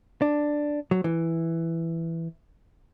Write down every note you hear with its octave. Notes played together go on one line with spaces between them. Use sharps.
D4
F#3
E3